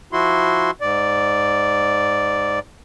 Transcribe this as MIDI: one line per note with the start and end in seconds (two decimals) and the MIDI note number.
0.13 0.71 53
0.13 0.71 64
0.13 0.71 66
0.13 0.71 84
0.81 2.59 44
0.81 2.59 74